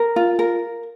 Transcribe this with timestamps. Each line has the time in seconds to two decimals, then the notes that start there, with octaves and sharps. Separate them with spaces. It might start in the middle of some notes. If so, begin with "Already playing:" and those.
Already playing: A#4
0.16 F4
0.39 A#4